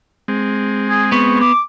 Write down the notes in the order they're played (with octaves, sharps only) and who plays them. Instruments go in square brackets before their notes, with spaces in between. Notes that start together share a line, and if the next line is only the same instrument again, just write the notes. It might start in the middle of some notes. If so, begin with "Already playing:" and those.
[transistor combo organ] G#3 C4
[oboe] G#4
[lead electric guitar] B3 [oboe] C#6
[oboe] D6